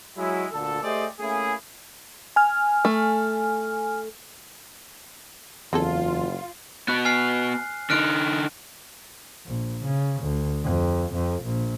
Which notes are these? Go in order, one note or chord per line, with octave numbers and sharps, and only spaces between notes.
F#3 G#3 E4
D2 A#2 D3 A4
A3 G4 G#4 C5 D5 D#5
A3 A#3 C#4 E4 G#4
G#5 F6
A3
F#1 E2 C4 F4 G#4 A4
B3 F#4 F#6
G#5 F6 C7
D3 D#4 F6 F#6 D7
A#1
C#3
D2
F2
F2
A#1